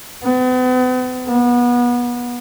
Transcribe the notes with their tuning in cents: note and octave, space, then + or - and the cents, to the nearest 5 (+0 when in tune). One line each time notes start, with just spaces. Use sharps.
B3 +40
B3 -30